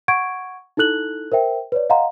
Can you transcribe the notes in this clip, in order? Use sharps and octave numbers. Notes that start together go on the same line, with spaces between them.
F#5 C#6 G#6 D7
D#4 E4 A4 F#6 F#7
A#4 C5 E5 G5
B4 C#5 D5
D#5 F5 F#5 A#5 C6